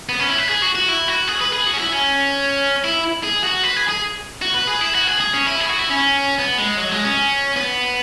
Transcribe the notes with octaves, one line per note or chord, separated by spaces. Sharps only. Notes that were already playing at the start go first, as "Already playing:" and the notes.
B3
C#4
E4
B4
G#4
F#4
F#4
E4
F#4
G#4
B4
G#4
F#4
C#4
E4
C#4
E4
G#4
F#4
B4
G#4
G#4
F#4
B4
G#4
E4
F#4
G#4
G#4
C#4
E4
G#4
F#4
E4
C#4
B3
G#3
F#3
G#3
C#4
B3